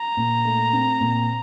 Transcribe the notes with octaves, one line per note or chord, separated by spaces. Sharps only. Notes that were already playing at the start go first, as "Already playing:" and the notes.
Already playing: A#5
A#2
A3
C4
A#2